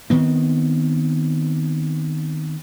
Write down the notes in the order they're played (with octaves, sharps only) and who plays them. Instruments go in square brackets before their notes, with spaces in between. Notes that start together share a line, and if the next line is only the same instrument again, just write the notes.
[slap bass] D#3 B3 C4